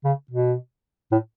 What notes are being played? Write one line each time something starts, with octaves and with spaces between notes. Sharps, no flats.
C#3
B2
A2